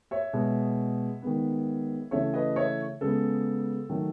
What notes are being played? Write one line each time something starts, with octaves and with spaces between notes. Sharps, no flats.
C#5 E5
B2 G#3 B3
D#3 G#3 B3
C#3 E3 A3 C#5 E5
B4 D#5
C#5 E5
C#3 G#3 B3 A4
D#3 F#3 A3